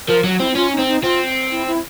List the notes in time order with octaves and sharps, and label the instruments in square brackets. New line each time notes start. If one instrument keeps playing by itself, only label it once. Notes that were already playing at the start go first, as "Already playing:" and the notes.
[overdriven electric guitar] F3 [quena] A#4
[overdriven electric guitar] F#3
[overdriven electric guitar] C4 [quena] E4
[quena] E4
[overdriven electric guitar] C#4 [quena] F4
[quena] D#4
[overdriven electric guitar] C4
[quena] D#4
[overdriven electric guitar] C4 [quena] F4
[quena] E4
E4